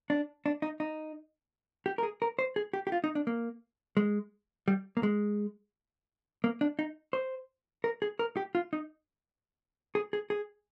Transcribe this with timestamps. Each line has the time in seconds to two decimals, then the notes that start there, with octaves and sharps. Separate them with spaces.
0.10 D4
0.46 D4
0.62 D#4
0.80 D#4
1.86 G4
1.98 A#4
2.03 G#4
2.22 A#4
2.39 C5
2.56 G#4
2.73 G4
2.87 G4
2.92 F4
3.04 D#4
3.15 D4
3.27 A#3
3.97 G#3
4.68 G3
4.97 A#3
5.03 G#3
6.44 A#3
6.61 D4
6.79 D#4
7.13 C5
7.84 A#4
8.02 G#4
8.19 A#4
8.37 G4
8.55 F4
8.73 D#4
9.95 G#4
10.13 G#4
10.30 G#4